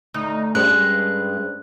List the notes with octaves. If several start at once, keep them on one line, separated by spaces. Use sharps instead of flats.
D2 D#4
G2 G#3 C#4 C5 D5 F#6